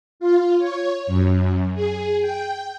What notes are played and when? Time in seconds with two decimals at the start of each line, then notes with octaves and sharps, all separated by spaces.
0.20 F4
0.59 C#5
1.07 F#2
1.74 G#4
2.21 G5